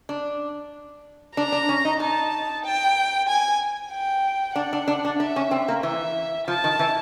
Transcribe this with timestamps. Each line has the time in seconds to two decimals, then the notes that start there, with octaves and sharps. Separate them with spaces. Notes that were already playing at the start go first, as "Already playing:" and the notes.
0.09 D4
1.36 D4 A#5
1.52 D4
1.69 C#4
1.85 D#4
2.00 D#4 A5
2.65 G5
3.28 G#5
3.92 G5
4.56 D4 F#5
4.73 D4
4.88 D4
5.05 D4
5.20 D4 E5
5.36 C#4
5.51 C4
5.68 A#3
5.83 E3 E5
6.47 F3 A5
6.64 D#3
6.79 E3